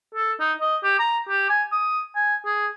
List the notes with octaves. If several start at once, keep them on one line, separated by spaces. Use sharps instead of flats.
A4
D#4
D#5
G4
A#5
G4
G#5
D#6
G#5
G#4